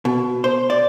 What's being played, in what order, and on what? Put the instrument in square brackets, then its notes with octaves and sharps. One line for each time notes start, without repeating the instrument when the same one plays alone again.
[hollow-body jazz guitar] B2
C5
D5